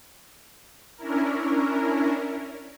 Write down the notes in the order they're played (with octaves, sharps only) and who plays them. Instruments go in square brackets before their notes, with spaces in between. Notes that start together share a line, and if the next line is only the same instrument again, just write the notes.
[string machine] C#4 D4 E4 A#4